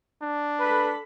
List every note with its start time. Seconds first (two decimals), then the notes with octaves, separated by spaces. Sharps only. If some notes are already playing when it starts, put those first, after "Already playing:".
0.21 D4
0.60 A4 B4 B5